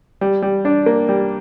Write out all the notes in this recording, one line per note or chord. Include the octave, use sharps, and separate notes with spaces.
G3
G3
D4
A#3
G3